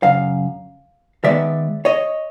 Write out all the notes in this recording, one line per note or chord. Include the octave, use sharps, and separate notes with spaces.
F#2 C#3 F5
D#3 G#3 B3 D5 E5
C#5 D#5